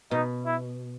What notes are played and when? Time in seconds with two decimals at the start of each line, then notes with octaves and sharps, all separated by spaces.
0.11 B2 D#4
0.45 E4